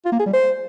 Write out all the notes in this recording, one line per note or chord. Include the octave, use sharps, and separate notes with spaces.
F4
A#3
G#4
G3
C5